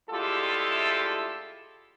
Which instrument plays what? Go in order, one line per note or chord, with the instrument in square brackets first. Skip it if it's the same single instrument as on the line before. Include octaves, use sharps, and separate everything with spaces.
[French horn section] D2 G#3 E4 F4 G4 A4